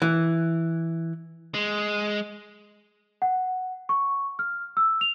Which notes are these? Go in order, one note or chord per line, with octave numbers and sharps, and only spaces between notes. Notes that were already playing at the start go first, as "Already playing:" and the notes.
E3
G#3
F#5
C#6
F6
E6
F7